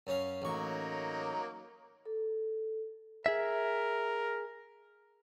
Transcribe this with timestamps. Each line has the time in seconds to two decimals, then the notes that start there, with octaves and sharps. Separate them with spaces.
0.07 F#2 C#4 F5
0.42 A1 F#3 A#3 D#4 C#6
2.06 A4
3.26 G#4 A#4 E5